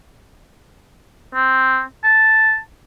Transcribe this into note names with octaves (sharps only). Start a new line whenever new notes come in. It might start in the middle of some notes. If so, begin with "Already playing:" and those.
C4
A5